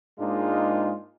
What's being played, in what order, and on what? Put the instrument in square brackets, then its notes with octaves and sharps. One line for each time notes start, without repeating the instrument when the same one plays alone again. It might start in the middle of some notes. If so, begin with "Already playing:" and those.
[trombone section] G#2 G#3 A#3 D4 D#4 F4